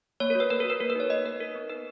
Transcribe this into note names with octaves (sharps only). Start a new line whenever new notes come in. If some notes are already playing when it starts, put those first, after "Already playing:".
A#3 C#5
A#4
F#4 B4
A#3 B4
A#4
F#4 B4
A#3 A#4
B4
D#4 C#5
A#3 D#5
A#3 B4
D#4 A#4
B3
D#4 B4